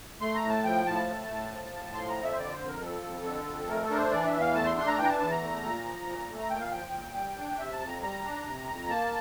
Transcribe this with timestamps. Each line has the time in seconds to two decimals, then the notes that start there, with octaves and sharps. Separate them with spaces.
0.21 A3 C6
0.35 A#5
0.43 A2
0.50 A5
0.64 F3 G5
0.86 A2 A5
1.08 A3
1.29 A2
1.51 F3
1.73 A2
1.95 F3 C6
2.09 A#5
2.16 F2
2.23 E5
2.32 C5
2.38 D3 D5
2.53 C5
2.60 F2
2.67 A#4
2.81 F3 A4
3.02 F2
3.24 D3
3.46 F2
3.68 A3 A#4
3.83 A4
3.90 D4 A#4
3.97 C5
4.11 E3 D5
4.26 E5
4.33 E2
4.40 F5
4.54 A3 A5
4.66 C6
4.76 D4 C6
4.87 A#5
4.98 E3 G5
5.04 A#5
5.09 A5
5.20 E2 A5
5.31 A#5
5.41 A3
5.63 A#2
5.85 F3
6.07 A#2
6.29 A3
6.39 A#5
6.50 A#2 G5
6.61 F5
6.72 F3 G5
6.93 A#2
7.15 G3
7.37 D4
7.59 C3 E5
7.73 A5
7.80 F2
7.88 A#5
8.02 G3 A#5
8.24 D4
8.45 C3
8.66 F2
8.89 A#3 A5